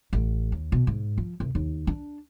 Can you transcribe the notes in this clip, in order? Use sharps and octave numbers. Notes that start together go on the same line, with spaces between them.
A1
D#2
B2
G#2
F3
C2
D#2
D4